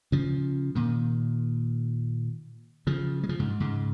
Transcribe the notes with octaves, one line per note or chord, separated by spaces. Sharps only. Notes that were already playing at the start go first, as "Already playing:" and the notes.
C#3 F3
A#2 D#3
C#3 F3
G#3
C#3 F3
G#2 C#3
G#2
G#2 C#3